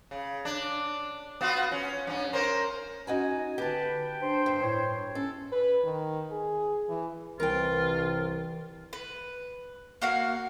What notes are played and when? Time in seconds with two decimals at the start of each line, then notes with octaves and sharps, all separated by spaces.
0.11 C#3
0.45 D4
1.41 B3 F4 F#4
1.72 C#4
2.07 G2 C#4
2.33 C#4 A#4 C5
3.07 C#4 D#4 F#4 G#5 A#5
3.58 D3 G4 B4 G5 A5
4.21 D4 C5
4.46 G2
4.63 A2 C#5
5.15 C#4 A4
5.52 B4
5.84 D#3
6.31 G#4
6.88 E3
7.40 C2 E3 F4 A#4 G5
8.93 B4
10.02 A#3 F#4 F5